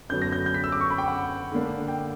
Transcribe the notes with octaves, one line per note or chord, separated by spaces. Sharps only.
F#2 D3 F#3 B3 D4 G6
A#6
G6
G6
B6
E6
D6
C#6
B5
G5
F#5
D3 A#3 D4
G5